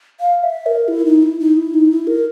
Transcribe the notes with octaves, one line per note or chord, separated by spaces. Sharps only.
F5
E5
A#4
E4
D#4
E4
D#4
E4
D#4
E4
A#4